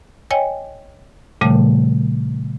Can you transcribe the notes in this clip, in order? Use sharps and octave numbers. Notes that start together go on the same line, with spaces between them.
C#5 D#5 G5 G#5
A#2 C#3 F3 G3 A3